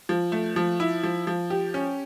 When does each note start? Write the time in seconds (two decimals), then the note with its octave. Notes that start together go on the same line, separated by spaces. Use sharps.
0.09 F3
0.32 A3
0.56 F3
0.80 E4
1.03 F3
1.27 F3
1.50 G4
1.74 C#4